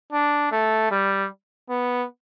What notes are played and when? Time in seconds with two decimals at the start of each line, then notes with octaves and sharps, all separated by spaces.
0.12 D4
0.51 A3
0.91 G3
1.70 B3